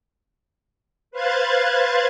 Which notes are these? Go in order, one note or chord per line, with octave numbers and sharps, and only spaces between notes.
B4 C5 F5 F#6 G#6 A6